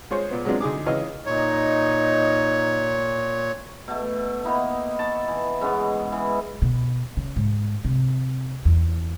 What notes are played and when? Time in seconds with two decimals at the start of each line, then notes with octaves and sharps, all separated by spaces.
0.10 G#3 F4 G#4 C5 C#5
0.31 A#2 B3
0.45 F#3 G#3 B3 C4 D4 F4
0.61 D2 D#4 G#4 D6
0.86 C#2 E3 C#5 D#5 F5 D#6
1.26 A#2 D#4 C#5
3.88 B2 A3
4.44 A#3 B3 D#4 E4
4.99 A5 C#6
5.28 E3
5.61 G#2 G#3 B3 C#4
6.12 E3
6.62 B2
7.17 C#3
7.36 G#2
7.85 C3
8.65 E2